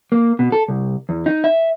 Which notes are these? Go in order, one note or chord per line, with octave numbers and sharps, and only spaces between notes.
A#3
B2
A4
C2
E2
D#4
E5